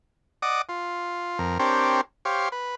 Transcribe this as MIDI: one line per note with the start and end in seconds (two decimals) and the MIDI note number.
0.42 0.62 74
0.42 0.62 75
0.42 0.62 78
0.42 0.62 86
0.42 0.62 87
0.69 1.39 65
1.39 1.58 41
1.39 1.58 70
1.59 2.01 60
1.59 2.01 62
1.59 2.01 67
1.59 2.01 70
1.59 2.01 72
1.59 2.01 73
2.25 2.49 67
2.25 2.49 72
2.25 2.49 73
2.25 2.49 77
2.52 2.75 71